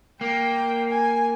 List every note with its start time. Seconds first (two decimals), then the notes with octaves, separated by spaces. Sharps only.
0.21 A#3 G5
0.90 G#5